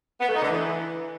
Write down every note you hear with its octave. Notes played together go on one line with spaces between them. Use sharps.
B3
A3
D#4
D3
E3